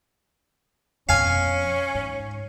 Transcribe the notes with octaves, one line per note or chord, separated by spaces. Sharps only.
F2 B2 C#4 F5 G#5
G#2